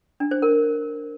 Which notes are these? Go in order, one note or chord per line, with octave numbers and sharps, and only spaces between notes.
D4
C5
A#4